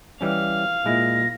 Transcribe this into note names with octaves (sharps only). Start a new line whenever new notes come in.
E3 G3 C#4 F5
A#2 G#3 E4 A#6